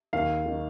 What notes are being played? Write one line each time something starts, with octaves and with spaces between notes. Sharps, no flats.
D#2 F5
D#3